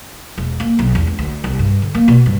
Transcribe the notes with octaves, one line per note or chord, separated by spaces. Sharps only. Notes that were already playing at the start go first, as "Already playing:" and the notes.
E1
A#3
B1
E2
C#2
D2
C2
G2
D3
A#3
B2
G2